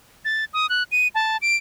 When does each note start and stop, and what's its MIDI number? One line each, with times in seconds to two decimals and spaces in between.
0.25 0.45 93
0.54 0.69 87
0.69 0.83 90
0.92 1.08 99
1.15 1.37 81
1.42 1.56 98